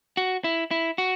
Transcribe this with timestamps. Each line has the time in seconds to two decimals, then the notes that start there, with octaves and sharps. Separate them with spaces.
0.17 F#4
0.44 E4
0.71 E4
0.98 F#4